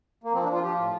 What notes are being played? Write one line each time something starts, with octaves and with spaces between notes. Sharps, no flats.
A#3
F3 C4
D4
F3
F4
F3 G4
F4
A2